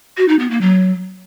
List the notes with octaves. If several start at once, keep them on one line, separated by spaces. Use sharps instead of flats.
F#4
D#4
B3
A#3
F#3